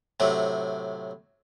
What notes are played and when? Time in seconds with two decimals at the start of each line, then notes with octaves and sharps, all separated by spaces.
0.20 A2 C3 F#3